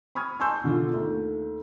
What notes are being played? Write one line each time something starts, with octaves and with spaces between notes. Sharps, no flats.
B5 C#6 D#6 F6 G#6
G#5 A5 C6 C#6 E6 G6
B2 D3 D4 F4
D#2 A3